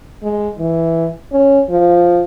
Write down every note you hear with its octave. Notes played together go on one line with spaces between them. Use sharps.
G#3
E3
C#4
F3